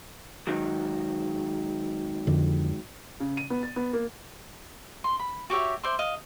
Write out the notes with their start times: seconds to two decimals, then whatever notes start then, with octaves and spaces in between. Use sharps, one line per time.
0.47 G#2 D#3 F#3
2.27 F2 D3
3.20 C#3
3.37 D#7
3.50 B3
3.63 A6
3.76 B3
3.93 A#3
5.04 C6
5.19 B5
5.50 F#4 G4 C#5 E5
5.83 C5 D5 E5 C6
5.99 D#5 F5